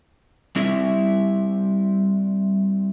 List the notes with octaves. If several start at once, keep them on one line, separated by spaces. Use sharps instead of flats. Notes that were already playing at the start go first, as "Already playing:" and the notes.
G3 C4 E4 E5